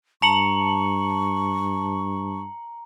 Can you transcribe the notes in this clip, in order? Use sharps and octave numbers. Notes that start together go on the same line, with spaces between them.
G2 A5 A#5 C#6 C#7 F#7